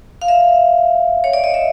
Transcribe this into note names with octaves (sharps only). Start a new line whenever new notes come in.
F5
E5
C#5
D5
D#5
E5